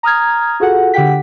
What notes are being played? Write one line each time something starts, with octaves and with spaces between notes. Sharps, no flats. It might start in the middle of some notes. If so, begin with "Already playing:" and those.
A#5 D#6 F6 G#6
F4 F#4 G#4 A4 F#5
D3 G4 F#5 G5 B6